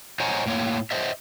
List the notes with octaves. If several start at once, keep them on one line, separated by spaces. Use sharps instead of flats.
C5 C#5 D#5 F#5 G#5 A#5
A2 A#3 C#5
C5 D#5 E5